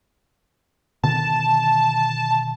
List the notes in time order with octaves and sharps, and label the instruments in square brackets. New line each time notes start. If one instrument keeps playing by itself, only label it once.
[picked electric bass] B2 D3 D#3 [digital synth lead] A5